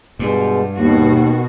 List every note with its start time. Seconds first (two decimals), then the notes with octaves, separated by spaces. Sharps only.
0.19 G2 B2 G#3
0.78 D#2 B2 D#3 F#4